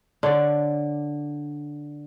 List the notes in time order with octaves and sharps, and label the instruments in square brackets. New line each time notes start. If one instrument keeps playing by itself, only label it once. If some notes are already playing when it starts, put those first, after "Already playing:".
[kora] D3 C#5 D5